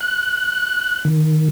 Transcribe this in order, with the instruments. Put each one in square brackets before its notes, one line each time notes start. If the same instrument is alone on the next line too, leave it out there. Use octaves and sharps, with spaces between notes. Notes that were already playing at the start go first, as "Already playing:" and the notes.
[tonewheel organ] F#6
D#3